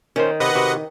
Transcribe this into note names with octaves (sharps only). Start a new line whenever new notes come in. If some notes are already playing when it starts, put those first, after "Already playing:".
D#3 C#4 C5
C3 B4 D#5 F#5
C3 F#4